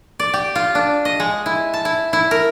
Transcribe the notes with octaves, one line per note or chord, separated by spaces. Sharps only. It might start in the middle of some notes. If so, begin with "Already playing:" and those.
D5
G4
F4
D4
D#5
G#3
E4
A5
E4
E4
A#4